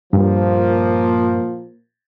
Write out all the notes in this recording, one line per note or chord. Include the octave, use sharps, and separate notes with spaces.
G2 A#2 F3 A#3